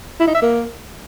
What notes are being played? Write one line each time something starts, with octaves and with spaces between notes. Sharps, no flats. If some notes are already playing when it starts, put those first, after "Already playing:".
E4
D#4
E5
A#3